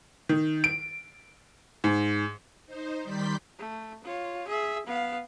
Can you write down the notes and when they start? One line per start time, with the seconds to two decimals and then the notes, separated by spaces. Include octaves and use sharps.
0.29 D#3
0.64 D7
1.84 G#2
2.66 D#4 C5
3.03 D#3 G3 D5 C6 G6 B6
3.58 A3
4.04 F4 C#5
4.47 G#4 E5
4.87 B3 F5